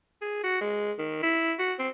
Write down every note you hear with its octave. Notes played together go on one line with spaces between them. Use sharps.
G#4
F#4
G#3
D#3
E4
F#4
C4